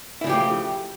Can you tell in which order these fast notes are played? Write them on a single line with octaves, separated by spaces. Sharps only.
E4 C#3 F3 G4 A3